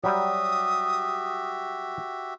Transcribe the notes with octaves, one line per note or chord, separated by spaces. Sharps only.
F#3 G3 F#4 G4 E5 D#6